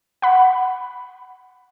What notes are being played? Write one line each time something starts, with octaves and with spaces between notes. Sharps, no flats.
F#5 B5